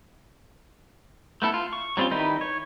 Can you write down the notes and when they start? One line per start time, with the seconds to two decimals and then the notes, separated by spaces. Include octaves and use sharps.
1.42 A3 B3 E4 A4
1.54 F4
1.73 C#6
1.97 F#3 G3 C4 C#4 F4
2.11 D#3 G3 D#4 E4 B4
2.41 C#5